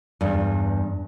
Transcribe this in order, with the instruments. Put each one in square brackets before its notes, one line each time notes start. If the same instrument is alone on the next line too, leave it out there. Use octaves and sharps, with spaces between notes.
[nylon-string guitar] E2 G2